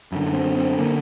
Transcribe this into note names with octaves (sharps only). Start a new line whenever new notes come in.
F#2 D3
C4
C4
D3 A#3